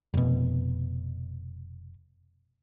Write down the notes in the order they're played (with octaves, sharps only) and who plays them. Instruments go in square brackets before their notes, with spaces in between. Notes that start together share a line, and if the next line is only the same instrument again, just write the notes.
[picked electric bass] F1 B2